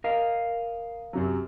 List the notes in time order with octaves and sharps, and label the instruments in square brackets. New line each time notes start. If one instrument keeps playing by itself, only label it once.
[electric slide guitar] A#4 D#5 F5
[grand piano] F#2 C3 F#3